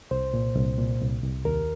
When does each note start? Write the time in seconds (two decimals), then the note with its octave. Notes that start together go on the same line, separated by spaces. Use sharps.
0.11 C2 C5
0.34 A#2
0.56 C2
0.78 A#2
1.01 C2
1.22 C2
1.45 D#2 A#4